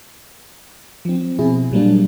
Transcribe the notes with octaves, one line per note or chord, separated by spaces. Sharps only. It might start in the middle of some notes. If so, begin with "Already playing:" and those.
F3 C4
B2 C4 E4 G#4
A#2 F#3 G3 A#3 D4